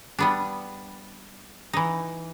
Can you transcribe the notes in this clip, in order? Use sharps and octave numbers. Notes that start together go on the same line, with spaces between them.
G3 B3 D4
E3 D#4